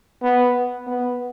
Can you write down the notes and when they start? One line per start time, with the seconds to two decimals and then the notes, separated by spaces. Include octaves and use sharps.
0.23 B3
0.87 B3